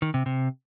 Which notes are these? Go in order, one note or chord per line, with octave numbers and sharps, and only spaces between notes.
D#3
C3
C3